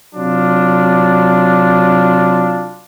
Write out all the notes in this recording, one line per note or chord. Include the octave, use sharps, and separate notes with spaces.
C3 F#3 D4 F4